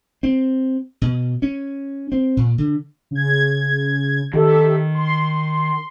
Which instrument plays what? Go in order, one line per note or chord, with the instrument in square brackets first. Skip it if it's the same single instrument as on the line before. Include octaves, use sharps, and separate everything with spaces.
[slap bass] C4
B2
C#4
C4
A#2
D3
[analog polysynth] C#3 G#6
[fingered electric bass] D#3 [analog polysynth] G4 A4 E5
[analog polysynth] C6